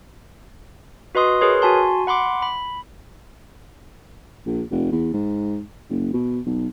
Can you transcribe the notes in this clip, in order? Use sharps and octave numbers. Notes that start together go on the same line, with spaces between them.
F#4 B4 D#5 C6 D#6
G#4 A#4 B4 C#5 C6
F#4 G#5 A5 C6
F#5 B5 C6 D6
B5
A#1
F1
E2
G#2
F#1
B2
B1